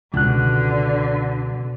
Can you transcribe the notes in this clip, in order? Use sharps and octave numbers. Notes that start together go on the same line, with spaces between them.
C#2 B2 D3 F#6